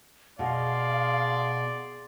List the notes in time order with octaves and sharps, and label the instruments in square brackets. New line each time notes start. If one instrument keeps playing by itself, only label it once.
[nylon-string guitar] B2 [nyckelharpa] G#4 C6 [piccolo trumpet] D5 [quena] F5